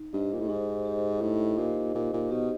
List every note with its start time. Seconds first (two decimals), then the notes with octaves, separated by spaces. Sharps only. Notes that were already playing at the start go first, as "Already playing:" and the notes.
Already playing: D#4
0.13 G2 G4 C5 D#5
0.33 A#2
0.40 A2
0.49 G#2 D#4
0.85 G4 C5 D#5
1.21 A2 D#4
1.58 A#2 G4 C5 D#5
1.95 A#2 D#4
2.13 A#2
2.31 B2 G4 C5 D#5